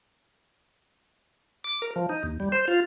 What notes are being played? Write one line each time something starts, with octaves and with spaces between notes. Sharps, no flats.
D6
A#4
F3
D#4
D#2
G3
C5
F4